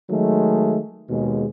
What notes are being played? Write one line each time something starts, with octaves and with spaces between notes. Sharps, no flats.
D#3 F#3 G#3 A3
D#2 B2 G#3